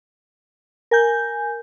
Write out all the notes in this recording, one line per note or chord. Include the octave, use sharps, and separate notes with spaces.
A#4 G#5 G6